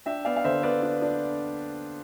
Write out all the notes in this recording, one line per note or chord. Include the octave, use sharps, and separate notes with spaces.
D4 E5 G5
B3 D5 F5
F5
D3 C5 E5
B3 B4 D5
D4
D4